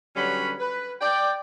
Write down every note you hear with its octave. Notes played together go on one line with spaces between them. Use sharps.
D3 F#3 G3 C#4 B4 B5
B4
D5 G5